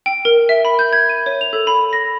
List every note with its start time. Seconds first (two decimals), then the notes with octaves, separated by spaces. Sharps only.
0.06 G5
0.25 A#4
0.49 E5
0.65 B5
0.79 G6
0.93 G#6
1.09 D#7
1.26 C#5
1.41 F7
1.53 A4
1.67 B5
1.93 A#6